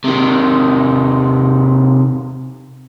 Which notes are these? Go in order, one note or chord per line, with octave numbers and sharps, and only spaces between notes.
C3 D#3